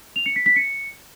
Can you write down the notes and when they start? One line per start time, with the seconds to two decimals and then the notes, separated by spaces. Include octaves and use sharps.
0.16 F7
0.26 C#7
0.36 B6
0.46 B6
0.56 C#7